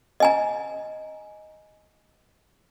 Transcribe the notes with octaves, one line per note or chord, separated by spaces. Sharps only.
D#5 G#5 A#5